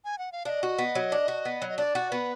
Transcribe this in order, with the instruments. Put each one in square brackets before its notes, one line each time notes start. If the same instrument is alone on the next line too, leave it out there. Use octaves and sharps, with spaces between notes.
[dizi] G#5
F#5
F5
[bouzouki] D4 [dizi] F5
[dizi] D#5
[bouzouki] F#4
B3
F#3
D4
F#4
B3
F#3
[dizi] D#5
[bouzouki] D4 [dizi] D5
[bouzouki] F#4
[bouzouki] B3 [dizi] B4